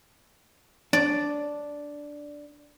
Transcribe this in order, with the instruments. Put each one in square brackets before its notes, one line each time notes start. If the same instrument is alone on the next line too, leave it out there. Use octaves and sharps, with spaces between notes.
[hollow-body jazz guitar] D4 [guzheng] D5